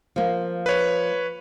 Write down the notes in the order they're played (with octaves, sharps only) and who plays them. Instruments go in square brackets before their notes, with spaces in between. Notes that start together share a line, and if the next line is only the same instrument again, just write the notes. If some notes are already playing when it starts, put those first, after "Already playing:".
[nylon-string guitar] F3 A#3
[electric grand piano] B4 C#5